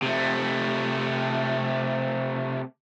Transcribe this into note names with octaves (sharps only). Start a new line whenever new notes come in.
C3 A3